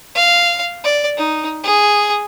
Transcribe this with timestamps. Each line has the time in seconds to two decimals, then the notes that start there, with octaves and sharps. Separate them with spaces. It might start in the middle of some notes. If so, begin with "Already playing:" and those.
0.15 F5
0.84 D5
1.17 D#4
1.63 G#4